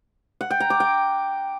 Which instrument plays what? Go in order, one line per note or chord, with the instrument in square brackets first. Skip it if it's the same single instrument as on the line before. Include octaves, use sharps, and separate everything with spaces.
[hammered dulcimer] F#5
G5
A#5
D6
G5